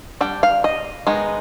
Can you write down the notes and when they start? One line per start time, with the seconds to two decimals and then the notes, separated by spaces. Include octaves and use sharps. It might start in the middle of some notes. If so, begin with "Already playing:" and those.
0.21 G3 D4 G5
0.43 F5
0.64 D#5
1.07 D#3 G#3 B3 D#4